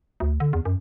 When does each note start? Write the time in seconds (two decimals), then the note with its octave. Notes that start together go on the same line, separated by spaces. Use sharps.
0.20 D2
0.40 D3
0.53 E2
0.65 F#2